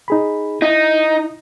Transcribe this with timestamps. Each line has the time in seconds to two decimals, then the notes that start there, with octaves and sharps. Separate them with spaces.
0.08 D#4 G#4 B5
0.62 D#4 E4